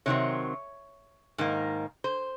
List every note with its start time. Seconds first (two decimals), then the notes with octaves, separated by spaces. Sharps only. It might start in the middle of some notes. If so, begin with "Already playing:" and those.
0.06 C3 D#3 F#3 C4 C#5
1.38 G#2 D#3 A#3
2.04 C5